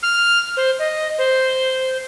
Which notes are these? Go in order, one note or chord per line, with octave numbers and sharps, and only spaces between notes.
F6
C5
D#5
C5